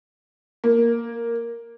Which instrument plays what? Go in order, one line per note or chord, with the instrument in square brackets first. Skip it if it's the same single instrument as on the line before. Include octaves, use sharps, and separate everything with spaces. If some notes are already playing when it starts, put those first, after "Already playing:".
[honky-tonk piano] A#3